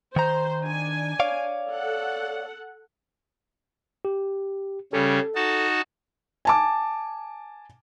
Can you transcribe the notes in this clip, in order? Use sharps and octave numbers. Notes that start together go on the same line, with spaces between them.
D#3 C5 A#5
D4 G#5
C#5 D5 F5
A4 F#5
G4
C#3 G3 C#4 A4
D#4 F#4 A5
G#5 A5 D6